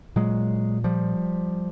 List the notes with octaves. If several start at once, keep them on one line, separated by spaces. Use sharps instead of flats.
A#2 F#3 G#3
F3 G3